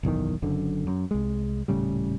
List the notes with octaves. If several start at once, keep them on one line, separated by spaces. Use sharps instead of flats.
F#1 B1 E2 D#3
F#1 F#2 D3
F#2
C2 G#3
D#1 A2 C#3 G3